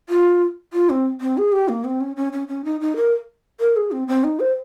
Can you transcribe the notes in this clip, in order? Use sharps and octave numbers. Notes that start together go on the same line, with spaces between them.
F4
F4
C4
C4
G#4
G4
A#3
C4
C#4
C#4
C#4
C#4
D#4
D#4
A#4
A#4
G#4
C4
C4
D#4
C5